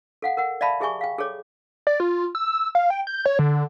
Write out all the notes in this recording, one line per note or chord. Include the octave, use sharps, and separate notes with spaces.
A4 F5 F#5
A#4 F#5
D5 E5 F5 A5 B5
G4 G#4 E5 G#5 C#6
F5 G5
G#4 A4 C#5 D6
D5
F4
E6
F5
G5
G6
C#5
D3